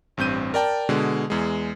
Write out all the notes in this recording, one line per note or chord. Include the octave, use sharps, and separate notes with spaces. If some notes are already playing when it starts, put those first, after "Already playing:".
A1 G2 C4 G6 D#7
A#4 D5 G5 A5
B2 D3 G#3
E2 G#3